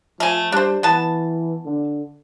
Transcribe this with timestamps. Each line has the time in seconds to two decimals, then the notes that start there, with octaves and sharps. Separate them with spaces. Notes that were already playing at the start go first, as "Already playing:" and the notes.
0.20 F3 A3 G#5
0.52 G3 D4 C5
0.83 E3 B3 A5
1.66 D3